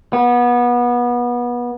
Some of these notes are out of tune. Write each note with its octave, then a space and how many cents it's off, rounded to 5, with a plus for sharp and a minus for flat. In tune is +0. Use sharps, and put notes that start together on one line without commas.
B3 -25